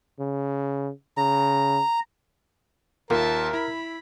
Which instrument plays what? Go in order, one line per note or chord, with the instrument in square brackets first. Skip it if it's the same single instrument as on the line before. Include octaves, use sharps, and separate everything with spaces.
[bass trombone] C#3
[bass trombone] C#3 [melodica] A#5
[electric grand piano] D#2 F4 [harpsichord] A#3 [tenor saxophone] A#4 [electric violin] E5 A5
[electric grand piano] E4 [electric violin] B5